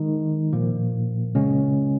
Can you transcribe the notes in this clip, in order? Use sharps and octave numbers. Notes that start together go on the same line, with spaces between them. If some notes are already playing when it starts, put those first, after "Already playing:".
Already playing: D#3 G#3 D#4
A#2 F3 A#3
C#3 G#3 C#4